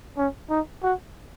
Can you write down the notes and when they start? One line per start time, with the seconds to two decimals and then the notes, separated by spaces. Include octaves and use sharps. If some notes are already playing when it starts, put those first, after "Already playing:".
0.17 C#4
0.50 D#4
0.83 F#4